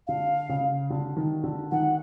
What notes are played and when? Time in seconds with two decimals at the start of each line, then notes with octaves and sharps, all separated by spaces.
0.07 D3 F5
0.49 C#3
0.90 D3
1.16 D#3
1.44 D3
1.72 D#3 F#5